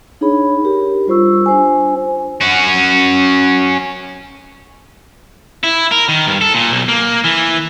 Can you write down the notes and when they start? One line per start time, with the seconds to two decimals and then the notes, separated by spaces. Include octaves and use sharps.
0.21 D4 D#4 G#4 C#5 B5
0.64 G4 A#4
1.07 G3 F4 C5 C#6 E6
1.46 D4 C5 G#5
2.41 C#4 F#4
5.64 E4
5.92 A#4
6.08 D#3
6.27 G2
6.41 A4
6.54 A#2
6.72 B1
6.88 A#3
7.24 E3